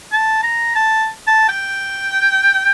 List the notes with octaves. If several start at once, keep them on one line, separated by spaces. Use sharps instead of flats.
A5
A#5
A5
A5
G5